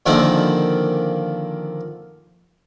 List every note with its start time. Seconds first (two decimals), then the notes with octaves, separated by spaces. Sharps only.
0.06 A#2 D3 D#3 F3 C4 F4